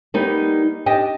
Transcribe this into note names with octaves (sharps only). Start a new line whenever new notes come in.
G3 A#3 B3 D#4
D4 G4 D#5 G5